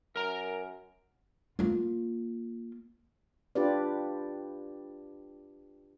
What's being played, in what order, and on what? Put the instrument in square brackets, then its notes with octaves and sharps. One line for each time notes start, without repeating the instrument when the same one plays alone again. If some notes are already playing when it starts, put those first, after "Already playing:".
[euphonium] F#2 [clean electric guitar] A#4 A#5
[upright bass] A#3 F4
[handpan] D4 F4 G4 B4 D5